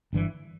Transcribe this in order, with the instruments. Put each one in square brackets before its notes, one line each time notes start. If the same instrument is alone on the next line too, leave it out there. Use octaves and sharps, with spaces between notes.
[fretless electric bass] G1 G2 E3